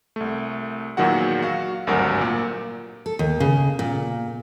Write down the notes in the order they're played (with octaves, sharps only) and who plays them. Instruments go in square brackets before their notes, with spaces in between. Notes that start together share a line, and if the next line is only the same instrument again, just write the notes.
[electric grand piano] C2 A3
E2 A#2 D#3 F#3 F#4 F#5
F#4 F5
G#1 D2 G2 F#3 A#4 F#5
A#2
[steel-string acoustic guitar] A4
D#2
C#3
A#2